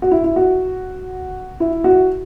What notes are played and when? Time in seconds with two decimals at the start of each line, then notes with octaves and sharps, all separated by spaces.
0.02 F#4
0.11 E4
0.24 E4
0.36 F#4
1.60 E4
1.84 F#4